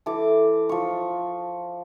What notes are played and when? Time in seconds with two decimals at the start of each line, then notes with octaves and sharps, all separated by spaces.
0.06 E3 A4 D6
0.69 F3 C#6